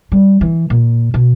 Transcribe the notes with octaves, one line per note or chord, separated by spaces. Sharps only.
G3
E3
A#2
B2